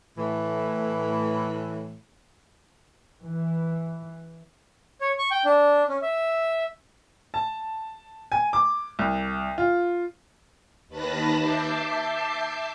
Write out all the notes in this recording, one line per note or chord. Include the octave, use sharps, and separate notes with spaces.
A2 E3
E3
C#5
C#6
G5
D4
C#4
E5
A5
G#5
D6
C2
F4
D#2 D#3 B4 A5 B5 A#6
E5 A5 D6 G6 C7